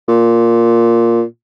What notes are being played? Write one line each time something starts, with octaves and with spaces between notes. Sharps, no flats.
A#2